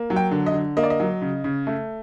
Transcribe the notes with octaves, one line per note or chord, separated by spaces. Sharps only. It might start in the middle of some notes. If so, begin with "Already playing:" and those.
Already playing: A#3
F#3
G5
D3
D#5
D3
A#3 D#5
D5
D#5
F#3
C#3
C#3
A3